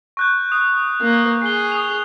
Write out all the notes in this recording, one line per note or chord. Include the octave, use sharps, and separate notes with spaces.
C#6 F#6 G6
D#6
A#3
G#4 C7 G7
D#6 F7